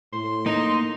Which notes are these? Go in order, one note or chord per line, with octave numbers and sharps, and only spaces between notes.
A2 C6
A#3 D#4 A#5